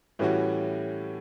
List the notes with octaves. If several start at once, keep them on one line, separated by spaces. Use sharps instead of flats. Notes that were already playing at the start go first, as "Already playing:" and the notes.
A2 E3 G3 C#4 F#4